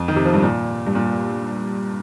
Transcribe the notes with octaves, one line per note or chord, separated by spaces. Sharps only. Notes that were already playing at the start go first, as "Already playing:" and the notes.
Already playing: F2
D#3
C3
F3
G2
A#2
G2
A#2